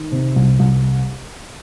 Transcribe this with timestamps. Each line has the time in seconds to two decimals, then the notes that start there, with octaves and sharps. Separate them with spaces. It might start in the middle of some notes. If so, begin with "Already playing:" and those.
Already playing: D#3
0.12 C3
0.36 C2
0.59 C2